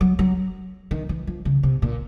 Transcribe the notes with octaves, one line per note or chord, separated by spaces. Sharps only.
F#3
F#3
D#3
E3
F3
C#3
C3
A#2